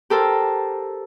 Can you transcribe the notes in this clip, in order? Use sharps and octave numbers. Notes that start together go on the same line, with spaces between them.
G4 A4 A#4 C5